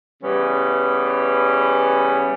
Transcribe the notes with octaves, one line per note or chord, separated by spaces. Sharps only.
C#3 E3 G3 B3 C#4